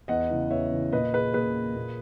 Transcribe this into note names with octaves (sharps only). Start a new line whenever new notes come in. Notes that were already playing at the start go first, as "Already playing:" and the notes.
E2 D#5 F#5
C#3 E3
E2 C#5 E5
C#3 E3
A#2 B4 D#5
G#4 B4
A#2 G#4 B4
A#2